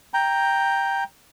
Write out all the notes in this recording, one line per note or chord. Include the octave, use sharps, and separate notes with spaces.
G5 A#5